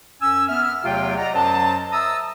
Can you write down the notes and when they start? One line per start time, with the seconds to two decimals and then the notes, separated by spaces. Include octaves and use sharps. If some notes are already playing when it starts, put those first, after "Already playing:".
0.22 F#2 C#4 G#5 E6
0.49 B3 E5 F6
0.84 E2 C3 F#3 A3 F4 G5
1.18 D5 D#5 F#5 A#5
1.34 F#2 F#3 C5 D#5 A5
1.92 E5 A5 A#5 D#6 E6